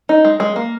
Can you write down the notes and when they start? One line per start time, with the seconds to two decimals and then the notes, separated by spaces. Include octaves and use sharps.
0.09 D#4
0.25 G#3
0.40 G#3
0.56 A#3